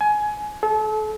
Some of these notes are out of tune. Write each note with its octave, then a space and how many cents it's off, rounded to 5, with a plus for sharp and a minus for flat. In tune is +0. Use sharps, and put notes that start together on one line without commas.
G#5 +20
A4 -35